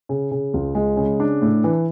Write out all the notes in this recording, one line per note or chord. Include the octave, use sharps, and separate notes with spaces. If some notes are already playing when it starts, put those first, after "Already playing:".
C#3
C#3
C#2
G#3
C#3
D4
A2
E3